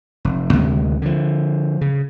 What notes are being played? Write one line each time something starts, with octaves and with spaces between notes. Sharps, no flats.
F1
D2 C3 D#3 G#3
D3 F3
C#3